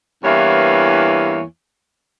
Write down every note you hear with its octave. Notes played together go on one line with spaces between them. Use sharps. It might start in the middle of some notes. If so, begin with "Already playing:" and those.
E2 G2 E3 A#3 C#5